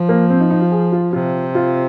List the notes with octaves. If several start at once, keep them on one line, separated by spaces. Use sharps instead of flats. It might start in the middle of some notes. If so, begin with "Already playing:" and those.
Already playing: F3
A#3
C4
D#4
D#4
F4
G#4
F4
C3 F4
F4